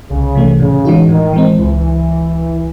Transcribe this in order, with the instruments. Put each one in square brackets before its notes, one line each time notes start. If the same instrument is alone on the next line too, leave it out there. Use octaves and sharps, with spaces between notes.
[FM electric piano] C2 [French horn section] C#3
[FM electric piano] C3 E3 A3
[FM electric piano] A2 [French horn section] C#3
[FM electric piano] E3 G#3 D#4 F#4
[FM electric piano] A2 [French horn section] D#3
[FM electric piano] E3 G#3 C4
[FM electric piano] C#2 [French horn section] E3